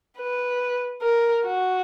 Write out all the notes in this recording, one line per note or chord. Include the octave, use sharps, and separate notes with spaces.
B4
A#4
F#4